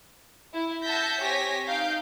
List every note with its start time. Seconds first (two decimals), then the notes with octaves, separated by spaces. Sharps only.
0.54 E4
0.84 E5 F#5 A5 G6 A#6 B6
1.20 C4 G4 C#5 G#5 A#6 B6
1.67 D#4 F5 G6 D7